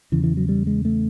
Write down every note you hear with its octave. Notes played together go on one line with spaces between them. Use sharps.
E2 C#3 E3
E3
F#3
G3
G#3
A3